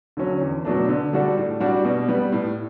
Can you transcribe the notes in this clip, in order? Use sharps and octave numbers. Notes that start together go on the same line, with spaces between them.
D3 F#3 C#4
E2
B2 F#3 A3 D4
D3
G3 D4 F#4 A4
A2
G3 D4 F#4
B2
G3 B3
A2